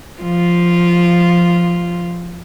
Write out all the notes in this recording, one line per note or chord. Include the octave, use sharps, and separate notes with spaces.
F3 F4